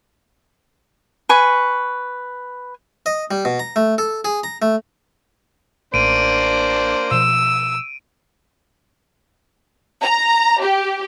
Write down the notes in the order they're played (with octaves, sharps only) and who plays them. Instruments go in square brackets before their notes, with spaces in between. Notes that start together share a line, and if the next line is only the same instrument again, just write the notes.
[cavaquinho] B4 G#5 C#6
[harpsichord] D#5
G3
B2
A#5
A3
A4
G#4
A#5
A3
[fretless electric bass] A1 [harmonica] A#3 D4 C5 [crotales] D7 D#7
[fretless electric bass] B2 F3 [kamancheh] E6
[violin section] A#5
G4